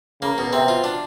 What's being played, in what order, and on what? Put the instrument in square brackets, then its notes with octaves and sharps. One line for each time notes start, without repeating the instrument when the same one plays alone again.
[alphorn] C#3 [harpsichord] A#3
[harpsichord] B2
[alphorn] C3 [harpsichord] C4
[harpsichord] F4
D4